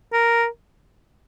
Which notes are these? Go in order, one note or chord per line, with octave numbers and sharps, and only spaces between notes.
A#4